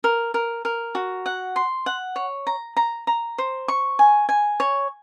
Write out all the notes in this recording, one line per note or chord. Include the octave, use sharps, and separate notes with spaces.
A#4
A#4
A#4
F#4
F#5
C6
F#5
C#5
A#5
A#5
A#5
C5
C#6
G#5
G#5
C#5